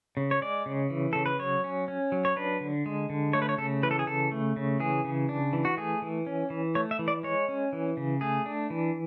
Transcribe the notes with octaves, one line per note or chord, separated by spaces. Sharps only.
C#3
C#5
G#3 D5
C#3
E3
C#3 A4
B4
F#3 C#5
C#4
C#4
F#3
C#5
D4 B4
D3
G#3
D3
A3 C#5
B4
C#5
C#3 A4
E3 B4
A4
G#4
C#3 A4
A3
C#3
E3 G#4
C#3
D4
E3
F#4
A3 G#4
E3
C#4
E3
A3 C#5
E5
E3
D5
G#3 C#5
C#4
E3
C#3
A3 G#4
D4
E3